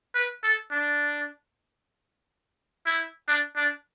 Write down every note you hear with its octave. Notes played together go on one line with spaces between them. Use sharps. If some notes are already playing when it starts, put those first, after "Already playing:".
B4
A4
D4
E4
D4
D4